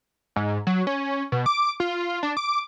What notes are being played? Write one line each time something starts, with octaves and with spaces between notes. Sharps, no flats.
G#2
F#3
C#4
B2
D6
F4
D4
D6